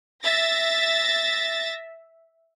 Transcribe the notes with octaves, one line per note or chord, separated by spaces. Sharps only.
E5 A6 A#6